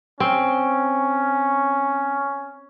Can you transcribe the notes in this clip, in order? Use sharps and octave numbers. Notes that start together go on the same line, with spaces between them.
C4 C#4